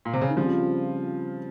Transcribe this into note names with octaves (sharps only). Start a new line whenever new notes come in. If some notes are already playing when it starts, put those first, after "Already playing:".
A#2
C3
C#3
D#3
C#3 F3 G3 C4 F4